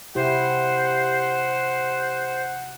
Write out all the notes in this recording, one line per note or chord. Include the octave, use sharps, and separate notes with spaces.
C3 E4 G4 C5 F#5